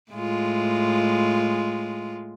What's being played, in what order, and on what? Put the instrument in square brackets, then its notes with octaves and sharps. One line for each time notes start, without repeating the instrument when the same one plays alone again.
[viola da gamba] A2 G#3 F4